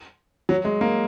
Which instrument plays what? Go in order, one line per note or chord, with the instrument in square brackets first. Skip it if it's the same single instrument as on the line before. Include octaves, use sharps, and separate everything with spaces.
[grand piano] F#3
G#3
A#3